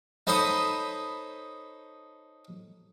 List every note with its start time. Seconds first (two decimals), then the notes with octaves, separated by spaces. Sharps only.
0.27 D#4 A4 C5 C#5 B5 D#6